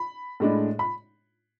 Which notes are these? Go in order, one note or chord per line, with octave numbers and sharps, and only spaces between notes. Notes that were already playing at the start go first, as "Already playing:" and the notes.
Already playing: B5
A2 G#3 D4
B5